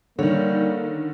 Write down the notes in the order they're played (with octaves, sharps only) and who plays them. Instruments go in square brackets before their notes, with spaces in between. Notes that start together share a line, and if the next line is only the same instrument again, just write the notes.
[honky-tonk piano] D3 D#3 [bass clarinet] G3 [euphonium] A#3 [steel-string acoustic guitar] C#5